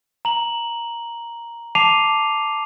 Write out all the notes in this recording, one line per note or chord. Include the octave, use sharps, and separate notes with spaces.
A#5 F#7
A5 D6 C7 D#7 F7